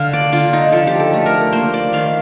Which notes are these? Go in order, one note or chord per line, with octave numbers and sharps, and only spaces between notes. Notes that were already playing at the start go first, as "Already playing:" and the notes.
Already playing: D3 F5
D5
D3 F4
D#4
F3 A4
G4
A4
A3
A#4
A#3 C5
D5
D#3 F5